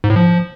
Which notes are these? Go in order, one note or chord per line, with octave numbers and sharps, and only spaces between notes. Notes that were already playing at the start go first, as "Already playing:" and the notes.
G#2
A2
F3